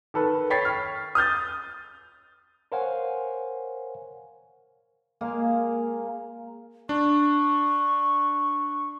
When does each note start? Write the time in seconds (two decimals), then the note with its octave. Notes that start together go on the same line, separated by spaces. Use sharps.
0.14 D#3 A4 B4
0.50 C#5 G5 B5 A6 B6 C7
0.65 C#6 F6
1.15 D#6 F6 G6 A6
2.72 A#4 C5 C#5 F5 F#5 G#5
5.21 G#3 A#3 G#4 F5
6.89 D4 C#6